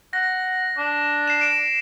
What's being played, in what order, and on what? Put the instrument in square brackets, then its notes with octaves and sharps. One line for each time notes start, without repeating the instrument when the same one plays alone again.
[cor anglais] F#5 [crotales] A#6
[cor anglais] D4
[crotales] C7 E7
D7 E7